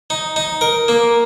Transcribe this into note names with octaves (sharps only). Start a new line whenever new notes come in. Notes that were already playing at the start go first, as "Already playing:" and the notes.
D#4
D#4
A#4
A#3